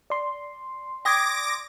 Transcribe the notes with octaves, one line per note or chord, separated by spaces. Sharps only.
D5 C6
G5 D6 D#6 G#6 A#6